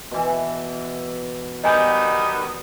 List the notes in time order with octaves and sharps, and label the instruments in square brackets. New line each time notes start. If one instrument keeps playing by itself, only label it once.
[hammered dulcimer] B2 E3
[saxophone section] D#3 G3 B3 [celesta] D#5 G#5 G6